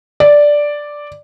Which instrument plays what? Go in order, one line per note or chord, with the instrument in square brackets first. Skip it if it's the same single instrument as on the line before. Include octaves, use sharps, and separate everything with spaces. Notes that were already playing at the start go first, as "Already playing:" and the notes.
[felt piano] D5